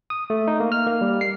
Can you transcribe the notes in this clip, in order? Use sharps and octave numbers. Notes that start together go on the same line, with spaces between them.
D#6
A3
D#4
A#3
F6
A#3
G3
C7